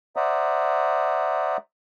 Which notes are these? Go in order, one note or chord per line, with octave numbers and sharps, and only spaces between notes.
C5 D5 E5 F#5 A#5 D#6